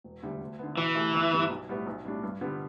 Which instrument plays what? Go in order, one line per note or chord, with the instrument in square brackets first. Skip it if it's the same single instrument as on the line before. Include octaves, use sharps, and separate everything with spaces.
[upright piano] E1
D2 D3 G3
D2
D3 B3
[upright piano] B2 [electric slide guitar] E3
[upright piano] A3 G4
G1
G2 G3 B3
B1
A2 G3 B3
B1
A2 G3 D4
G2
D3 G3 B3 G4